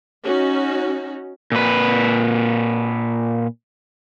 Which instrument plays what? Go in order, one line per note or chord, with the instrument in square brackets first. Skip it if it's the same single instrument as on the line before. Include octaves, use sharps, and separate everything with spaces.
[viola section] C#4 D#4 F#4
[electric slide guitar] A#2 B4